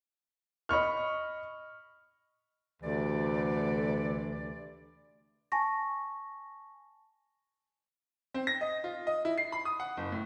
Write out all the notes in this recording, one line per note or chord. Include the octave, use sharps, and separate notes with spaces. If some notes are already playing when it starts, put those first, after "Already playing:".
D#5 B5 C#6 F6
D2 C3 E3 D5
G#5 A5 C#6 A#6
C4
A#6
D#5
F4
D#5
E4
C7
B5
D#6
F#5
F#1
A2